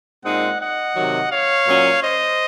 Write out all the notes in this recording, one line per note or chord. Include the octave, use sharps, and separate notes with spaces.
A#2 G#3 C4 D#4 D#5 F#5
D#5 F#5
C3 D#3 F#3
C#5 F5
A#2 F#3 C#4
C5 D#5